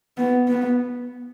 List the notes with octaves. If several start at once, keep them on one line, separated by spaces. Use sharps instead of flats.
B3
B3